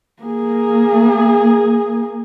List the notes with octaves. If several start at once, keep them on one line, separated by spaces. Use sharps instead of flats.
A#3 G#4